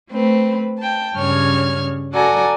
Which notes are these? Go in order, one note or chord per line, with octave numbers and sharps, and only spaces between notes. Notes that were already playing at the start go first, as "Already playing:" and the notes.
A3 C4 B4
G5 A5
G2 C#3 C#5 F6 G#6
F#4 A4 D5 F#5 G#5 A#5